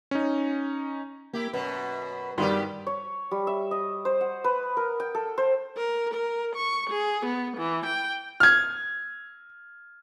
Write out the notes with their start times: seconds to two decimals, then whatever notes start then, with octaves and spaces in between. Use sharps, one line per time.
0.11 C#4 D#4
1.34 A#3 E4 G4
1.53 F#2 B2 B4
2.38 G2 D#3 G3 B3 G4 C6
2.87 C#5
3.31 G3
3.47 E5
3.71 D#5
4.05 C5
4.21 F#5
4.44 B4
4.77 A#4
5.00 G5
5.15 A4
5.38 C5
5.77 A#4
6.14 A#4
6.55 C#6
6.90 G#4
7.26 B3
7.57 E3
7.86 G5
8.40 F6 G#6